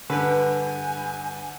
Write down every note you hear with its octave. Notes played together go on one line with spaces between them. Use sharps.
G2 D3 B4 G#5